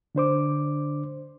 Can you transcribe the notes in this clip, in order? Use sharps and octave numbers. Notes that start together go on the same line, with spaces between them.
D3 D4 C5 D6